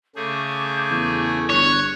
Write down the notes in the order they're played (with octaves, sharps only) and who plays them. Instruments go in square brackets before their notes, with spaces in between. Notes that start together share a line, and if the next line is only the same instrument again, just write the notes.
[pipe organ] C#3 A3 G#4 [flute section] D6 G6
[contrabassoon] E2
[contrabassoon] G1 [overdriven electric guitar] C#5 [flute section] F#6